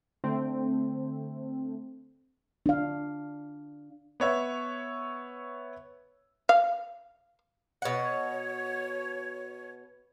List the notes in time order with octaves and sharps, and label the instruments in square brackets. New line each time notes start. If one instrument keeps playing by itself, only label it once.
[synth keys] D3 A3 C4
[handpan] D4 F5
[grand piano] B3 C#5 E5
[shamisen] F5
[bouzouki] B2 F#5 [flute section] C#5